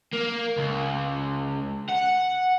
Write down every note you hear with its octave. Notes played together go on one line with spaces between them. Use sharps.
A#3
C#2
F#5